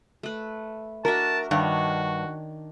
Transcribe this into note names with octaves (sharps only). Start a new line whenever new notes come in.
A3 B4
D4 F#4 A#4 E5 A5
G2 D#3 D4 F#4 C#5